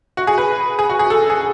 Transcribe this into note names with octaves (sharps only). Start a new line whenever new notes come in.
F#4
G#4
B4
G#4
F#4
G#4
A4
G#4